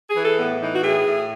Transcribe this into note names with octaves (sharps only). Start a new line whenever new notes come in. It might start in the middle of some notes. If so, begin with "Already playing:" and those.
G#4
E3
A4
A2 B3
E3 D#4
F#4
A2 G#4
A2